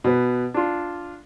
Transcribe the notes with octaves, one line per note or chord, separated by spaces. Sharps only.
B2 B4
D4 F4